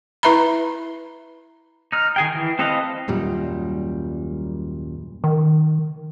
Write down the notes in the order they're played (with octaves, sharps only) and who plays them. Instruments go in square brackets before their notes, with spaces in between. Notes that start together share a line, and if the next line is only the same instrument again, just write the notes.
[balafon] E4 B4 E5 A#5 B5
[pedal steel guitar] D#4 F6
D#3 G#4 G5
E3
C4 A4 B4 D#5 F5
[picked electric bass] D#1 F#2 A#2 G3
[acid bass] D#3